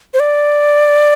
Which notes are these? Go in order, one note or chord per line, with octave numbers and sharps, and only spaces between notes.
C5
D5